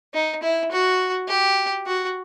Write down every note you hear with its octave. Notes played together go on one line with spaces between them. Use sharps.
D#4
E4
F#4
G4
F#4